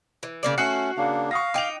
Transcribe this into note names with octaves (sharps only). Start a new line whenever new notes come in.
E3
C#3 A#3 D5
A3 C#4 F#4 F#6 C7 C#7
C#3 A#3 D4 F5
F5 C#6 D#6 A#6
D#4 G5 D6 F7